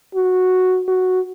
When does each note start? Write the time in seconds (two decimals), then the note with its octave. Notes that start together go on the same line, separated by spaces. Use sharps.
0.15 F#4
0.88 F#4